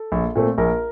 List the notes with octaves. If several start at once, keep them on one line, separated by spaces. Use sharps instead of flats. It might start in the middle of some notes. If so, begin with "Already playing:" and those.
Already playing: A4
A#1
A#2 A3 C4
A#1 A#4